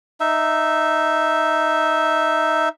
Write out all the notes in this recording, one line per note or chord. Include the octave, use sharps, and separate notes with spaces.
D#4 E5